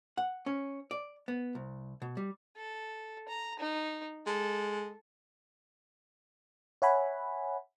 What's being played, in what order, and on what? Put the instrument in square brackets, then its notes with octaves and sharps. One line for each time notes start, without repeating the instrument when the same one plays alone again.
[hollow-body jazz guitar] F#5
C#4
D5
B3
C2
B2
G3
[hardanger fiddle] A4
A#5
D#4
[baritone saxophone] G#3 [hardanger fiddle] A4
[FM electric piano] C#5 E5 F#5 G#5 B5